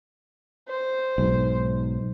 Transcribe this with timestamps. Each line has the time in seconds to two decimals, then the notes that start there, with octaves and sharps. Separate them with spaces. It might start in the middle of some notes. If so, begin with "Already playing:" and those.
0.69 C5
1.18 B1 G#2